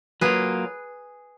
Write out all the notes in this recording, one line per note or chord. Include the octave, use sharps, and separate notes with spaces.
F#3 A#3 F4 G#4 B4